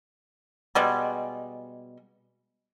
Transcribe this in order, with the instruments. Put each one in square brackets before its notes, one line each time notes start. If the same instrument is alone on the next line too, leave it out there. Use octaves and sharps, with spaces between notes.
[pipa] B2 G3 G#3